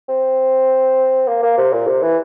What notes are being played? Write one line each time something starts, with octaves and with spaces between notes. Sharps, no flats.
C4
A#3
A#3
C3
A#2
C3
E3